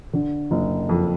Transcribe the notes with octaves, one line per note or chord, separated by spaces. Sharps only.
D3
F#1
F2